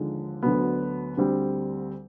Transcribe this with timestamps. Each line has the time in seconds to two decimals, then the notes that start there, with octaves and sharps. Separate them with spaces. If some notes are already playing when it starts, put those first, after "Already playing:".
Already playing: D#2 D3 F3 G#3
0.43 D2 D3 F#3 B3
1.17 D2 D3 G3 C4